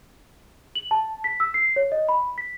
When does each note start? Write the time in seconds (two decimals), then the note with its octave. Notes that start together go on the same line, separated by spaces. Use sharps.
0.75 F#7
0.91 A5
1.24 B6
1.40 E6
1.54 C7
1.76 C#5
1.92 D#5
2.09 B5
2.38 B6